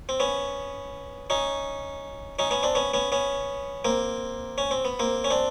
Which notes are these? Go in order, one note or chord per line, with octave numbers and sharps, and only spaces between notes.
C4
B3 C#4
C#4 D#4
C#4 D#4
B3 C#4
C4 D4
B3 C#4
B3 C#4
B3 C#4
A#3 C4
C#4
C4
B3
A#3 C4
C#4
C4 D4